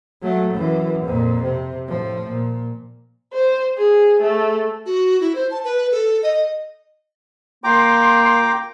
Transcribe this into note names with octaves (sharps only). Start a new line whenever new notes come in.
F#3 A3
F#2 E3
F2 A#2
C3
A2 F3
A#2
C5
G#4
A3
F#4
E4
C5
A5
B4
A4
D#5
A#2 A#3 G5 A#5 C6 D6